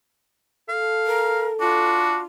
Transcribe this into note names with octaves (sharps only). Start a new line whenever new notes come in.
A4 F5
A#4
D4 F4 F#4